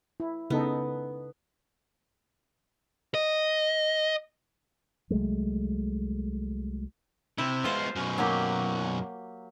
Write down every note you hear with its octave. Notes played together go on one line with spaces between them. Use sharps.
E4
C#3 B3 D#4 A4
D#5
C2 F#3 G#3 A3
C3 E4
G#3 B3 F4 C5 F5
F#2 B2
F#3 A#3 G4